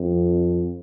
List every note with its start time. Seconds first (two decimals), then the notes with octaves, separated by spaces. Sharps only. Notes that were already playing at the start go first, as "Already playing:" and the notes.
Already playing: F2